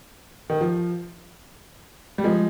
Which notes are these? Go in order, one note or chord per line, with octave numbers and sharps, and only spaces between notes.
D#3
F3
G3
F3 G#3